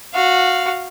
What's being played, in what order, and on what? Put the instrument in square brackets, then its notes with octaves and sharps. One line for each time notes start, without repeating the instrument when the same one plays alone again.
[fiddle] F#4 F5